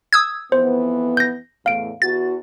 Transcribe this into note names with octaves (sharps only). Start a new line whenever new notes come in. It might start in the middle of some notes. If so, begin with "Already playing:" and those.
D#6 E6 G#6
F2 E3 B3 C5
G6 A#6
E2 A2 F5 D7
E2 F#4 A6